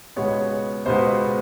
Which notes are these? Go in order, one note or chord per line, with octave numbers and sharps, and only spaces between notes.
C#2 B2 G#3 B3 C#5
C#2 B2 G#3 B3 C5